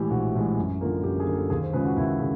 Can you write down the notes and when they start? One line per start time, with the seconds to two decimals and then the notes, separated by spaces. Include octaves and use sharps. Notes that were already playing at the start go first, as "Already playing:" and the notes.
Already playing: A2 E3 G#3 G4
0.11 A#1 F#4
0.35 A2 E3 G#3
0.57 F#2
0.81 D3 F3 A#3
1.04 F#2 G4
1.20 G#4
1.27 D3 F3 A#3
1.36 A4
1.50 D#2 G#4
1.63 C5
1.73 C#3 F3 G#3 B4
1.85 F#4
1.97 D#2 E4
2.20 C#3